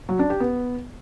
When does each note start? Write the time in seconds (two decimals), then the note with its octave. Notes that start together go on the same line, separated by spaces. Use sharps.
0.09 F#3
0.19 D4
0.30 G4
0.40 B3